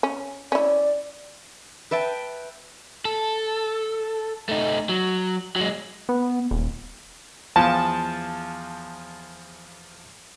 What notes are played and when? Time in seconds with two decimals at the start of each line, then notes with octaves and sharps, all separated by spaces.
0.03 C#4
0.52 C#4 E4 D5
1.91 B4 E5 G5 A5
3.05 A4
4.49 A3 D#4
4.89 F#3
5.56 F#3 G#3
6.09 B3
6.51 D#1
7.56 E2 F3 A5